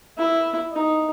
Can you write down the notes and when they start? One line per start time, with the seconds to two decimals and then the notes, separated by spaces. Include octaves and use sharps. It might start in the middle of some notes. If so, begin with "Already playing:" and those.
0.18 E4
0.72 D#4